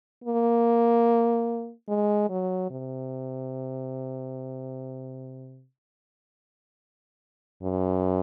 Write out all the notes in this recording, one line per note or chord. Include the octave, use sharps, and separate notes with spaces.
A#3
G#3
F#3
C3
F#2